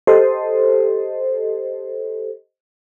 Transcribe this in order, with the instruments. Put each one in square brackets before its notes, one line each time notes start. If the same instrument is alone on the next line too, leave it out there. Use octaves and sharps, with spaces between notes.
[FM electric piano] G4 A4 C5 D#5